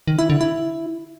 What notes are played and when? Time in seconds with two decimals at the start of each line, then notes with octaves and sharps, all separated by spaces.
0.08 D#3
0.19 E4
0.30 D3
0.41 E4